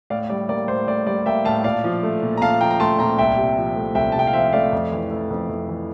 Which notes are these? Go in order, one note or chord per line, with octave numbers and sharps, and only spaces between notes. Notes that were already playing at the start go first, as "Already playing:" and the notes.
A2 D5 F5
G3 D5
A#3 D5
A2 C5
A2 D5
G3 D5
A#3 E5 G5
A2 F5 A5
A#2 D5 F5
F3
A3
A#2
A#5
A#2 F5 A5
F3 G5 A#5
A#5
A3 A5 C6
A#2 G5 A#5
C2 E5 G5
C3
F3
A3
C2 E5 G5
A5
C3 G5
F5
F3 C5 E5
A3 D5 F5
F2
E3
A3
F2
F2
E3